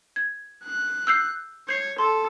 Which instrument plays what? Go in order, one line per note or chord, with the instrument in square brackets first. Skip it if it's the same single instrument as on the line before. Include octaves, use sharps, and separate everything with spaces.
[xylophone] G#6
[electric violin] F#6
[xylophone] E6 G6 C7
[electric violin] C#5 [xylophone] G6 C7
[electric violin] A4 [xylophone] C6